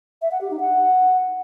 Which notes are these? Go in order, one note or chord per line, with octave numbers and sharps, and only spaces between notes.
E5
F#5
G4
D#4
F#5